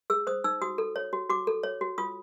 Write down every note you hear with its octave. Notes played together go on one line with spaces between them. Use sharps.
G#4 E6
C5 D#6
D#4 E6
F#4 D#6
A4
C#5
F#4
F#4 D6
A4
C#5
F#4
F4 D#6